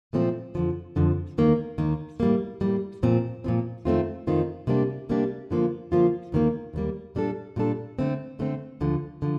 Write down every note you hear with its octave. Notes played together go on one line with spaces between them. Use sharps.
A#2 F3 A3 C4
F2 D3 F3
F2 D3 F3
D#2 D#3 A#3
D#2 D#3 A#3
A2 G3 A#3
A2 G3 A#3
A#2 F3 C4
A#2 F3 C4
F2 D#3 A3 C4 F4
F2 D#3 A3 C4 F4
C3 G3 A#3 D4 G4
C3 G3 A#3 D4 G4
D3 F3 A#3 F4
D3 F3 A#3 F4
D#2 D#3 G3 A#3
D#2 D#3 G3 A#3
A#2 G3 D4 A4
A#2 G3 D4 A4
D3 A3 C4
D3 A3 C4
D2 D3 F3
D3 F3